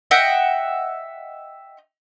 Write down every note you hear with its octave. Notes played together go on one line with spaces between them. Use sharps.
D#5 E5 F#5 G5